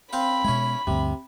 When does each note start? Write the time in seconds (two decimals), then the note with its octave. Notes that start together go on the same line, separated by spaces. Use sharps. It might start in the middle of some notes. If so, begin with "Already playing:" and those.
0.13 C4 C5 F5 B5
0.44 B2 G#3 C#4 E4
0.87 D2 G2 C3